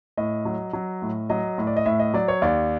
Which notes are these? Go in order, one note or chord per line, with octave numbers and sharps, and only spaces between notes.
A2 D#5
F#3
F#3
A2
F#3 D#5
A2
D5
D#5
A2 E5
D#5
F#3 D5
C#5
D#2 D5